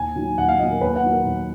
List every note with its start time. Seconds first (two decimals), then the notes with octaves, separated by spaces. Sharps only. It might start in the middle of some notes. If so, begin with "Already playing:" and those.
Already playing: D#2 G#5
0.16 D#3 F#3
0.38 D#2 F#5
0.49 F5
0.59 D#3 F#3 D#5
0.71 A#4
0.81 D#2 B4
0.96 F#5
1.03 D#3 F#3
1.11 A#4
1.26 D#2